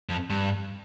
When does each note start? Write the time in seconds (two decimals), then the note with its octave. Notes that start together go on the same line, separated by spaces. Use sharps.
0.09 F2
0.30 G2